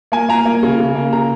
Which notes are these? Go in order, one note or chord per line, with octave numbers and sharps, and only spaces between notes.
A#3 G#5
A#3 A#5
A#3
C#3
C#3
A#3
C#3 A#5